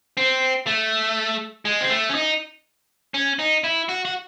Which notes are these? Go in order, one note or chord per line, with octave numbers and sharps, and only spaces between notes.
C4
A3
G#3
C4
A3
C#4
D#4
C#4
D#4
E4
F#4
F#4